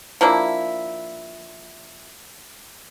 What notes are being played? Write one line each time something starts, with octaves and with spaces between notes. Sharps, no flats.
F3 A#3 D4 E4